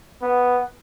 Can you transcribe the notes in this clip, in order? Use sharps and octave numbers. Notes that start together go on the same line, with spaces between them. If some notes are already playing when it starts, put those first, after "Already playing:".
B3